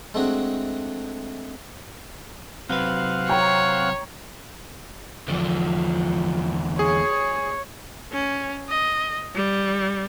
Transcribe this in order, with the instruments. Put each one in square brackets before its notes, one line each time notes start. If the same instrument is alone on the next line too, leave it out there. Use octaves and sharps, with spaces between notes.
[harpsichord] G#3 A3 C4 D4 F#4 G#4
[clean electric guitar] C3 F#3 B4 [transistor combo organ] C4 F5 F#5
[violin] C#5 [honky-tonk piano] G5 A#5
[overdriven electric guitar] E2 D3 [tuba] F3
[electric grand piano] G#4 [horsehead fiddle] C#5
[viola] C#4
D#5
G3